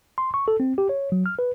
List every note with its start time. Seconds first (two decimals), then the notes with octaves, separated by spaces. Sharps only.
0.18 C6
0.34 C#6
0.48 A4
0.60 C4
0.78 G4
0.89 C#5
1.12 F#3
1.26 F6
1.39 B4